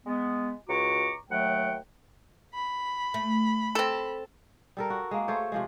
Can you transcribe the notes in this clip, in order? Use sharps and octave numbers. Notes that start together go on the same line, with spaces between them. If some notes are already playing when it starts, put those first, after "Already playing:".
G#3 B3
C#2 F#4 A#5 C#6 D6
D#2 F#3 A3 F#5 G5
B5
A3
C4 A4
G3 A4 A#4
F#4
G#3 A#3
A3 A4 C5 C#5
C3 F3 G#3